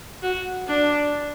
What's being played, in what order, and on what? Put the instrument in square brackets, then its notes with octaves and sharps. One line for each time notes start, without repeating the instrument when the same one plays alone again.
[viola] F#4
D4